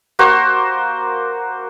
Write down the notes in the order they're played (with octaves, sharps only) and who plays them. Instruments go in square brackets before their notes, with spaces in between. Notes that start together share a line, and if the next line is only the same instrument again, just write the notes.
[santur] A#3 F#4 C5